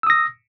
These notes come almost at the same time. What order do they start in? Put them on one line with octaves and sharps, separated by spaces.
E6 D#6 A#6